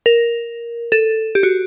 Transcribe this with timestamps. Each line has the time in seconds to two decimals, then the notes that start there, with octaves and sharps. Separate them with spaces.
0.06 A#4
0.92 A4
1.35 G4
1.43 F#4